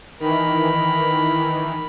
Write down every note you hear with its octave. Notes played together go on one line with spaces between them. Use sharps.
D#3 E3 A#4 B5